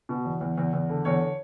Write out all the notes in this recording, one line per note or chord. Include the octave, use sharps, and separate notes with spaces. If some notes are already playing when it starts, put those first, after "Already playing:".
B2
E2
E2
E2
E2
D3
E2 C#5